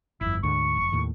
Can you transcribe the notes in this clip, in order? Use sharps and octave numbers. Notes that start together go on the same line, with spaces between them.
G1 F2 E4
D2 G#2 D3 C#6
F1
D#2 A2 D#3